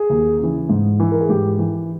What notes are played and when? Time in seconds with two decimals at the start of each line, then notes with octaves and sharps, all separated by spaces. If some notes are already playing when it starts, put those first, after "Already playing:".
Already playing: G#4
0.10 D#2
0.39 C#3 E3
0.69 G#2
1.00 E3
1.12 A#4
1.21 G#4
1.29 G#2 G4
1.59 E3